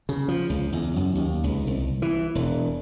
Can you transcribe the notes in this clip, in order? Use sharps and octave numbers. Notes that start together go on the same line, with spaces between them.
C#3
F3
C#2
E2
F#2
D#2
C#2
C2
E3
E1